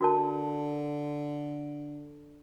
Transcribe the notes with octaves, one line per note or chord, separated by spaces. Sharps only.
D3 F#4 A#4 A5